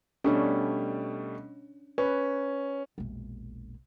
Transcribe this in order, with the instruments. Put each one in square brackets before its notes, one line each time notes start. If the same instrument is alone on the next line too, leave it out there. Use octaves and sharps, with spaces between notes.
[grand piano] B2 G3 A3 [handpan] C#4 D4 C#5
[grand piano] C#4 [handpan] B4
[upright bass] E1 A#1